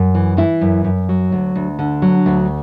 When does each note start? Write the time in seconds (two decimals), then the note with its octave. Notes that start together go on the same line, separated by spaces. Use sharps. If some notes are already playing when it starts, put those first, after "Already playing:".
Already playing: F#2
0.15 E3
0.37 E3 E4
0.61 F#2
0.84 F#2
1.09 F#3
1.32 D2
1.55 D2
1.79 D3
2.02 F#3
2.26 D2